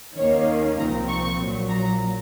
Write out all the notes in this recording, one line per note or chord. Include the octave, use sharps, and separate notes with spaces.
D#2 D#3 A#3 C#4 C#5
C2 A#2 F3 C4 A#5
C#6
A#1 A#2 F#3
A#5